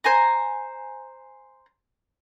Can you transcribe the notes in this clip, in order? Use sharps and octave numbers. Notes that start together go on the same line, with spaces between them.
C5 G#5 A#5